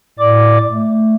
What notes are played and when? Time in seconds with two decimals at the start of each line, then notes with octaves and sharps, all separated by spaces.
0.19 A2 D5 D6
0.71 A3